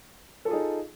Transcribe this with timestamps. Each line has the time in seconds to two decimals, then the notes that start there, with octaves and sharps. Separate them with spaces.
0.45 A4
0.48 F4
0.50 G#4
0.53 D#4